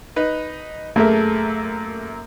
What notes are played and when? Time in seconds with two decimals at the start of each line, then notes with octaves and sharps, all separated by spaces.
0.16 D#4 B4
0.96 F#2 A3 A#3 G#4 E5